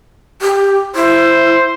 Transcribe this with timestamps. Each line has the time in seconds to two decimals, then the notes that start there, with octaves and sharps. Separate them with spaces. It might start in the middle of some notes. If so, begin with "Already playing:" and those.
0.42 G4
0.95 E4 C5